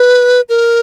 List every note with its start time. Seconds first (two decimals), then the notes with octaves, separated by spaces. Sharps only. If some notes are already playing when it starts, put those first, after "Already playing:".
Already playing: B4
0.49 A#4